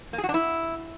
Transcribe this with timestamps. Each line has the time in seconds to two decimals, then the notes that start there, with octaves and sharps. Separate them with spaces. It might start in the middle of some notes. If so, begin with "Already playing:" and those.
0.13 A#3
0.18 G#4
0.24 F#4
0.29 D4
0.34 E4